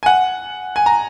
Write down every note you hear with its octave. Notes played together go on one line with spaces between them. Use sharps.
G#5
F#5
G#5
A#5